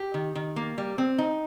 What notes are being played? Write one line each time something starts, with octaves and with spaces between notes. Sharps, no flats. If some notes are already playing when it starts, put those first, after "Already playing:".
Already playing: G4
D#3
D#3
A#3
G3
C4
D#4